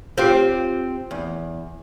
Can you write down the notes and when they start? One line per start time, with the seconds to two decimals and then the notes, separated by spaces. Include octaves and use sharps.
0.18 C4 F4 G4
1.11 E2